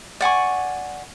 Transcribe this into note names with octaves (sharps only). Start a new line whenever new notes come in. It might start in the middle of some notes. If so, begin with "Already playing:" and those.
D5 F#5 G#5 C#6